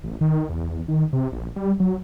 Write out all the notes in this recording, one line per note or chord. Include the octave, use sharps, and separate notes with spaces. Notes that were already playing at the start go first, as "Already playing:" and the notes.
A1
D#3
E2
D#3
C3
A#1
G3
F#3